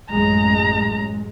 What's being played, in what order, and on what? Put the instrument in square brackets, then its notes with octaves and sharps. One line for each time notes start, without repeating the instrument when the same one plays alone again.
[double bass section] A1 F#2 G#3 [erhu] A#5